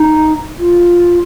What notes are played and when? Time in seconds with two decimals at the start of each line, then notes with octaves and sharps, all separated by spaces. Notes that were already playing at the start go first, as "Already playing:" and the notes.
Already playing: D#4
0.59 F4